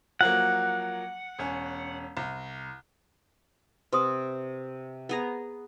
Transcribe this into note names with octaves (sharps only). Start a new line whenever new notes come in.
F3 F#3 A#3 F#5
E1 C#4
C2
C3 B4 C6 D#6
B3 G#4 A#5